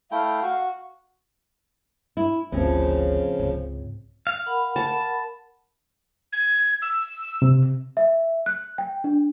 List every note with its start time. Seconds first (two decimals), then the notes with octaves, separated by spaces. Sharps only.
0.12 A3 E4 F5 G5
0.42 F#4
2.17 E4
2.52 G#1 D2 C#3 F3 C4 C#4
3.39 C#2 G#2
4.27 F5
4.46 A#4 F#5 B5
4.76 A5
6.33 G#6
6.82 E6
7.42 C3
7.97 E5
8.46 F#6
8.78 G5
9.04 D4